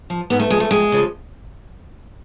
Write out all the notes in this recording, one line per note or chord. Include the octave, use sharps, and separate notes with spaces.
F3
G#2 B3
A3
F3 G#3
A3
F2 G#3
C#3 F3